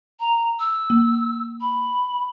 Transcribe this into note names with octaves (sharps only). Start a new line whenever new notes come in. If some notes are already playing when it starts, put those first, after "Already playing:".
A#5
E6
A#3
B5